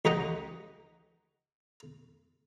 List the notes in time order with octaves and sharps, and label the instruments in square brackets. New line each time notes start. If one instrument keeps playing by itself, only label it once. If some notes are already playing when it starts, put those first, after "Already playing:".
[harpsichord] C#2 D#4 G4 D#5 F#5